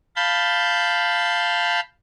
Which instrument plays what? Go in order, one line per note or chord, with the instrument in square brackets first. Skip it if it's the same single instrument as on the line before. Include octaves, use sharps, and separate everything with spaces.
[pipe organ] F5 A5 B5 G6